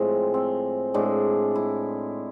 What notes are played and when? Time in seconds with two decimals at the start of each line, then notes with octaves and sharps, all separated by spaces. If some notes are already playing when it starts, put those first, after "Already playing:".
Already playing: A2 F3 G#3 C4
0.34 C4
0.94 A2 G#3 D4
1.55 E4